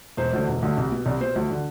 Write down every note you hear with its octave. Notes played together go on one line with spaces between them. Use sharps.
E1 C5
D2 D3
E1
D2 D3
C2
B2
C2 D5
B2 C5
D2
D3